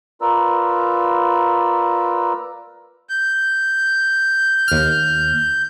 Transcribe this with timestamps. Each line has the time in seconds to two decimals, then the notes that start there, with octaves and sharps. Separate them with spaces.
0.21 F4 A#4 B4 D5 A#5 E6
3.09 G6
4.68 D#2 F6